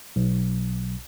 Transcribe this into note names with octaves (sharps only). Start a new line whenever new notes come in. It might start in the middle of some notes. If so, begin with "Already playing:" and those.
B1